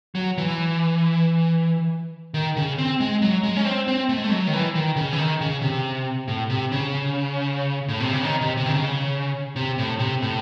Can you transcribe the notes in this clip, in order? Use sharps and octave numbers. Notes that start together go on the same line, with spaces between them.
F#3
E3
D#3
C#3
C4
G#3
F#3
G#3
C#4
C4
C4
A3
G#3
A3
F#3
D#3
E3
D#3
C#3
E3
D#3
C#3
C3
A2
C3
C#3
A2
C3
C#3
D#3
C3
C3
D#3
C#3
C3
A2
C3
A2